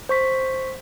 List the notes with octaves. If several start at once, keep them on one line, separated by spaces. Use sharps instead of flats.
C5 C#6 B6